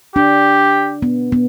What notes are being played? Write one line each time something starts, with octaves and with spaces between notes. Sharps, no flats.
D4 G4
B3
B3